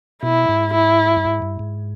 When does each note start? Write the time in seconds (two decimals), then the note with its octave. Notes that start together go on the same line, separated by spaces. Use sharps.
0.23 B2 E4
0.49 G#2
0.74 E4
1.17 G2
1.25 G#2
1.42 G2
1.59 G#2